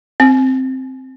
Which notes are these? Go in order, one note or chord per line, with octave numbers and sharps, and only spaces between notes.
C4